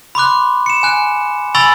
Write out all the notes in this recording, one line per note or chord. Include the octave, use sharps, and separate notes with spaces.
B5 C6 D6 F#6
C#7 E7
G#5 F#6
G#5 B5 C#6 E6 A6 F#7